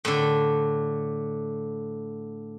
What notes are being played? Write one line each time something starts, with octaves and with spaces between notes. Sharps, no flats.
A2 D3